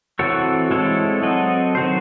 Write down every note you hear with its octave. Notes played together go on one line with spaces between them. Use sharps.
E3 C4 F#4 A4 C#5
G#3 C4 E4 A4 C#5
F#3 C4 F#4 A4 D#5
D#3 F#3 C4 F#4 C5